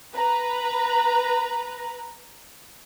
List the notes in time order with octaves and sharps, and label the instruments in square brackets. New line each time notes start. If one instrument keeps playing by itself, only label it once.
[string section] B4 A#5